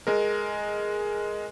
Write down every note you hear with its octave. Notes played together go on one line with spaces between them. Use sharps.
G#3 A#4